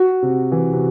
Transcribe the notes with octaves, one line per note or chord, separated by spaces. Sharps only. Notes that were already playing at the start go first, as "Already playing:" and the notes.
Already playing: F#4
C3
E3
C3